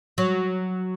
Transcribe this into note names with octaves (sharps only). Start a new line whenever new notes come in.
F#3